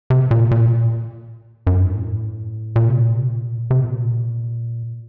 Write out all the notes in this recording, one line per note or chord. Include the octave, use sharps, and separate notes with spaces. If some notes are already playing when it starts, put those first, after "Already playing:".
C3
A#2
A#2
F#2
G2
A2
A#2
C3
A#2
C3
A#2
C3
A#2